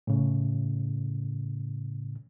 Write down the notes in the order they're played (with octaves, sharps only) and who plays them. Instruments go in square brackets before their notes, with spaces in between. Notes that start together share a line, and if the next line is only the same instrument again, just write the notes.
[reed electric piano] A2 C#3